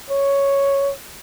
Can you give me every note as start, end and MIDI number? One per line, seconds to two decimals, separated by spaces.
0.10 0.91 73